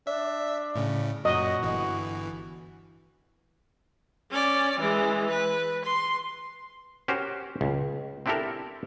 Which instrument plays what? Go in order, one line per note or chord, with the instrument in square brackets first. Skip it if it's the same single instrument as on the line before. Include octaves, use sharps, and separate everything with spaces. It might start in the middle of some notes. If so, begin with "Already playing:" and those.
[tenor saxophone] D4 [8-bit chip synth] E5
[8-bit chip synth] A2 C#3
[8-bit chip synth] F#2 A#2 [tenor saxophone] F#4 [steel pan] D#5
[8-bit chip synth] G1 E3
[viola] C#4 D5
E3 G#3
B4
C6
[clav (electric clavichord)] C#4 F#4 G4 A#4 C5
C#2
C4 D4 E4 G4 A4 A#4